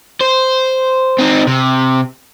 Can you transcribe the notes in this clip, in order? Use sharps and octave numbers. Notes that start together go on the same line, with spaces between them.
C5
C4 D#4
C3